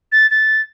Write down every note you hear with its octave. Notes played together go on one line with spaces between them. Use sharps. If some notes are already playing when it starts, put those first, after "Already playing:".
A6
A6